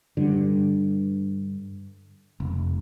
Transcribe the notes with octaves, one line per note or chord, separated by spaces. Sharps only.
G2 D3
F1